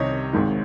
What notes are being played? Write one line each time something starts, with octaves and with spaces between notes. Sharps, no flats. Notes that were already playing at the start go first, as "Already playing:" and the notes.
Already playing: C2 C3 D#3 C#5 D#5
G#1 G#2 D#3